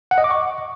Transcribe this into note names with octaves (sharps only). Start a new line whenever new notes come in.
F#5
D#5
D6
C#6